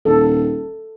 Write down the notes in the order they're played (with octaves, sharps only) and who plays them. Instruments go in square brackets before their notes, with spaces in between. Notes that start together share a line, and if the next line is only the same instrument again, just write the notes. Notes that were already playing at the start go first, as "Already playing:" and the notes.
[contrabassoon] D#1 [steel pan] A4